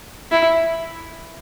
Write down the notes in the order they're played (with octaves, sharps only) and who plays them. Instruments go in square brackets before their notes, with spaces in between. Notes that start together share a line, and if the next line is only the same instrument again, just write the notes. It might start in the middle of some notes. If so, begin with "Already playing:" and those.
[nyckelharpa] E4